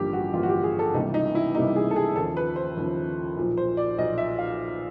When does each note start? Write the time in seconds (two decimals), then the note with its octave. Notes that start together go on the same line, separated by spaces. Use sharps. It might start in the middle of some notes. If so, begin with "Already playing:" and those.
Already playing: A1 G2 D3 F3 A#3 G4
0.13 F#4
0.33 A1 G2 D3 F3 A#3 F4
0.43 F#4
0.49 G4
0.63 G#4
0.79 A4
0.94 C#2 C3 E3 G3 A#3 D#4
1.14 D#4
1.35 E4
1.55 C#2 C3 E3 G3 A#3 D#4
1.76 G#4
1.91 A4
1.96 G#4
2.16 D#2 C#3 F3 A4
2.37 B4
2.56 C5
2.77 D#2 C#3 F3
3.37 B1 A#2 F3
3.57 C5
3.77 D5
3.98 B1 A#2 F3 D#5
4.18 E5
4.38 F5